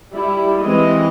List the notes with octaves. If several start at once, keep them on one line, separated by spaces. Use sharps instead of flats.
G3 E4
E3 G#3 C4 D#5